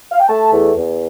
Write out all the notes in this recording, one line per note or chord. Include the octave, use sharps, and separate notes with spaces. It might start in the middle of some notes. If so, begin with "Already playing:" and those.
F5
G5
A3 A5
E2
E2